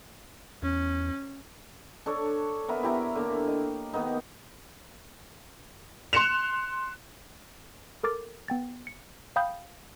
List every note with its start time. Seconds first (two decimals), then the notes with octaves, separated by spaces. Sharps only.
0.63 E2 C#4
2.06 D4 A4 C#5
2.68 B3 A#4 B4 E5
2.83 E4 G4 A#5
3.15 D3 A#3 A#4
3.47 D#5
3.93 D#3 A#3 B3 D#4
6.13 C6 F#6 C#7 E7 F7
8.03 A4 A#4 D6 A6
8.48 B3 G5 A6
8.87 C#7
9.36 F5 G5 B5 D#6 G6